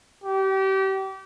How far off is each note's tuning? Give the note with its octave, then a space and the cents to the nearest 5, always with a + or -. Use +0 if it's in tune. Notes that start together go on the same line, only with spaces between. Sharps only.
G4 -30